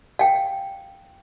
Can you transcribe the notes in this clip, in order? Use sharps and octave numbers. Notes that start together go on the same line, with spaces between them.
F5 G5